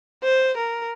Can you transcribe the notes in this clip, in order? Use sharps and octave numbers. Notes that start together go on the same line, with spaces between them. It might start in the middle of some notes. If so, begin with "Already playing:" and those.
C5
A#4